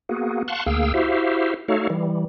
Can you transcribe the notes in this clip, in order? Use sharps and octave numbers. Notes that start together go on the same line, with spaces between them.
A#3 B3 F#4 G#4
F5 F#5 A5 C6 C#6 F#6
D2 A#3 G#4 F5 G5 E6
E4 F#4 G4 C5 E5 F5
A3 D#4 F#4 A4 C#5 F5
E3 G3